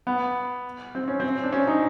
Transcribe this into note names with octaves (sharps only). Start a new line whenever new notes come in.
B3
C4
C#4
C4
D4
C#4
D#4